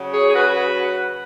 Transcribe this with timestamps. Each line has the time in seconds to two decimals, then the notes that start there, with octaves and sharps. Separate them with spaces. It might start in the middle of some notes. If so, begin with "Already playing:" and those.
Already playing: C#3 F#3
0.13 G#4 C#5
0.28 G#4
0.35 F#4 B4